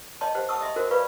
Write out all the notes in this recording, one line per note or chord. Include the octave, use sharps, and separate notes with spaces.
C#5 D#5 G5 A5 C6
G4 C5 F#5
F#5 A5 C#6 D#6 E6
D#5 E5 G5 C6
F#4 A#4 C5 G5
B4 D5 F5 B5 C#6